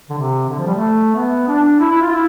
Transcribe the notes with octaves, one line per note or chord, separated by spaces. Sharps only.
D3
C3
D3
F3
G3
A3
B3
D4
E4
E4
F4
E4